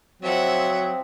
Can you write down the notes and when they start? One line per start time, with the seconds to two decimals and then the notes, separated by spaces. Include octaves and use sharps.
0.22 F3 F#3 C4 E5 F#5